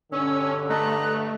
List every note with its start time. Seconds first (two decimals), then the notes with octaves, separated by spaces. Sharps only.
0.12 G2 B2 D3 C#4 E6
0.70 A3 D#5 A#5 F#6